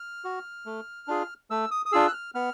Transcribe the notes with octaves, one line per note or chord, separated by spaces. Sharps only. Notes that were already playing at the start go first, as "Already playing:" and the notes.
Already playing: F6
F#4
A3
D4 F4 G#4
A3 E6
D#6
D#6
D4 F4 G#4 E6
F#6
F6
B3 F6